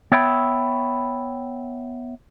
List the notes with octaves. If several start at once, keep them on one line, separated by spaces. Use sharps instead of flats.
B3 C#5 E5 G5 B5